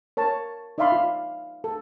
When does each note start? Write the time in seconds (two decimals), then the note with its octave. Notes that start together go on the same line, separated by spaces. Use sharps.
0.17 A#4 C#5 A5
0.78 D#4 D5 E5 F5 B5 C6
0.92 F4
1.64 A4